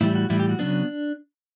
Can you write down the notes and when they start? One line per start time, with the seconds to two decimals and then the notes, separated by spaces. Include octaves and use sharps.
0.01 A2 E3 G3 E4
0.15 F#4
0.30 A2 E3 G3 E4
0.40 G4
0.49 F#4
0.59 C#3 F#3 B3 D4